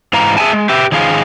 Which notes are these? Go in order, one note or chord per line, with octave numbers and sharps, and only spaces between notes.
G#2 E3 F5 A#5
G#4 E5 F#5 G#5 A5
G#3
G4 B4 E5
D#3 F3 G#3 G#4 F5